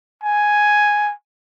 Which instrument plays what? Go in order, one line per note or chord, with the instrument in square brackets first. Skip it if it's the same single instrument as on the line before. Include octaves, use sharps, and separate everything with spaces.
[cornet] G#5